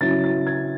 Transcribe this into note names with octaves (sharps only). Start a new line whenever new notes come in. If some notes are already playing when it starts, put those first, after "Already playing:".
C#3 F#3 C#4 E4 A6
A6
G#6